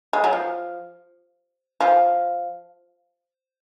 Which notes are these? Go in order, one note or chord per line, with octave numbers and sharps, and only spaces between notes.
G#3
F#3
F3
F3